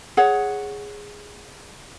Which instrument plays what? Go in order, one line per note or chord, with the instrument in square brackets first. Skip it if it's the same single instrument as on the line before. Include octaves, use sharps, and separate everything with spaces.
[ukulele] G#4 C#5 F#5